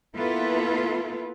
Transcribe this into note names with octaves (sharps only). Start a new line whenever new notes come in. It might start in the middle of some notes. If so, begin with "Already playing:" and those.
A#3 B3 E4 F4 A4 B4